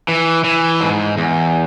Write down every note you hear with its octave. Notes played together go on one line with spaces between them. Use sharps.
E3
E3
G#2
E2